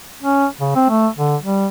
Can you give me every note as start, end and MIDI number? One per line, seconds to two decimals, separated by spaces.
0.23 0.46 61
0.60 0.71 49
0.75 0.88 60
0.90 1.08 57
1.18 1.36 50
1.41 1.67 55